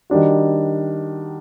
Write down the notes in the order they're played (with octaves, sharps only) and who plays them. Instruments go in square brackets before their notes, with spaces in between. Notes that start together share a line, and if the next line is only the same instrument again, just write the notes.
[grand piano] D#3 G3 D4 F#4